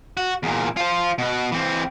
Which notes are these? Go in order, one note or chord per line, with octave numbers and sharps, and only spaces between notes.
F#4
E2 A#2
F4 C5
B2 B4
E3 C4